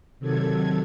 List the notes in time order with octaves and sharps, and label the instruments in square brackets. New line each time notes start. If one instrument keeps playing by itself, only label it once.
[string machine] C3 D#3 F#3 A4 G#6